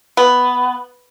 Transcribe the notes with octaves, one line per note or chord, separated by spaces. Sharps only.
B3